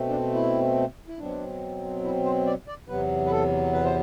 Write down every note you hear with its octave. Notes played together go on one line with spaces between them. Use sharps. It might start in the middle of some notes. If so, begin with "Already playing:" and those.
Already playing: B2 A3 C4
D4
E4
E4
B2 F#3 C4 D4
E4
C5
D5
D5
E2 C3 F#3 B3 B4
B4
A4
B4
C5